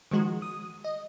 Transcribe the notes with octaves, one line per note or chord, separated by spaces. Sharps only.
D#3 F3 G#3 F#4
D#6
D#5